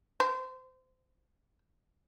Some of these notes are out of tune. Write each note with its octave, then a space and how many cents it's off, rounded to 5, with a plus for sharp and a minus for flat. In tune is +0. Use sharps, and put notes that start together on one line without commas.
C5 -25